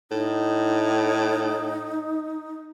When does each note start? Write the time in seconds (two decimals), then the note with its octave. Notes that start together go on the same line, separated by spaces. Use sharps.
0.11 A2 D#4